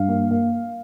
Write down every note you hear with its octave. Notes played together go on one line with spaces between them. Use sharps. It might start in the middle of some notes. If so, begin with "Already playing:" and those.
Already playing: G2 F5
A#3
A#3